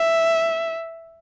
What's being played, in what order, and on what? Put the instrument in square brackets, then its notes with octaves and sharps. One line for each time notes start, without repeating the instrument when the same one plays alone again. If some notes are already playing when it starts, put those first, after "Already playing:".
Already playing: [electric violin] E5